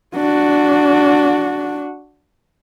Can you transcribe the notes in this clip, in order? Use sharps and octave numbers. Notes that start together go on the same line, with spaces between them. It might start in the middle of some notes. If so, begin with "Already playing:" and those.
D4 F#4